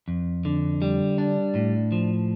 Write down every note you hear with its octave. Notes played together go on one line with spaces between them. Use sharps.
F2
D3
G3
D4
A2
F3